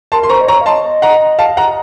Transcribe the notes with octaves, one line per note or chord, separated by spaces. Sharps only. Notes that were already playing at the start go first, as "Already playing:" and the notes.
A#4 A5 C6
C6
C5 A#5 C#6
D#5
C#5 A#5 C#6
F5
D#5 A5 C6
F#5 A#5
F5 A5
F#5 A#5